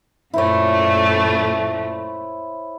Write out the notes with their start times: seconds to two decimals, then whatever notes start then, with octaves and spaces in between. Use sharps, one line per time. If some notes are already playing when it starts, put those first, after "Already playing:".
0.34 F#2 A#2 A3 E4 C5 C#5